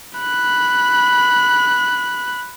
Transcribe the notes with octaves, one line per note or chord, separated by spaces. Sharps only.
B5 F#6